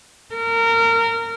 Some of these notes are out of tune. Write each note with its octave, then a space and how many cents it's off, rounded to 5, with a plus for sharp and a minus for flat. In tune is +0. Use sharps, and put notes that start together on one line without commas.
A#4 -25